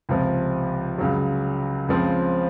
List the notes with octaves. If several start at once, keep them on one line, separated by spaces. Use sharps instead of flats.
C#2 C3 F3
C#2 C#3 F#3
C#2 C#3 F3 C4